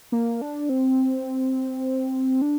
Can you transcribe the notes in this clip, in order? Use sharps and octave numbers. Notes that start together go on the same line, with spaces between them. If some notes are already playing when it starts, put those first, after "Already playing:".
A#3
D4
C4
D4